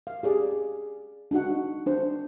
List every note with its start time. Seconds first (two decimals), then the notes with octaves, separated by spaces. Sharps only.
0.07 F5
0.23 G4 G#4 D5
1.31 D4 D#4 F#4 F#5
1.86 D4 C5